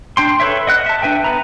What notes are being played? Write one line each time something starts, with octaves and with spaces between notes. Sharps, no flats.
D4 G5 C6
A4 B4 C#5 E5
D#5 F#5 F#6
E5 A5
D4 B4 E5 G5
B3 B4 A#5